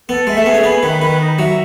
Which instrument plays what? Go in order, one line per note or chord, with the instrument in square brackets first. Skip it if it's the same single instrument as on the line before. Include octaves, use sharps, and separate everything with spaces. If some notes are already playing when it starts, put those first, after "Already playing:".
[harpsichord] B3 [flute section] A4
[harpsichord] G#3 [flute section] E5
[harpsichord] A3
[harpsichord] B3 [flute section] G#4
[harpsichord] C#4
[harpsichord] B3 [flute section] B5
[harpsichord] D#3 [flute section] B4
[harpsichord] D#3 [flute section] B4
[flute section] D#4
[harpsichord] F#3 [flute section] E5